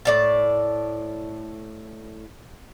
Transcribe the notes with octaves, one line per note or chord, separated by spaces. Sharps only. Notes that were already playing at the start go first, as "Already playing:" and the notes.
A2 D5 A5